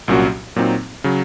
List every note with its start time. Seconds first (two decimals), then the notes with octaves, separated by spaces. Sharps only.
0.08 C2 A#2 F#3 C#4 F#4
0.56 A#2 F#3 C4 D#4
1.04 C#3 F#3